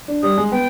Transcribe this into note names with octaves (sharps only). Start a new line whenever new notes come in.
D4
G3 D#6
G#3
B3 G5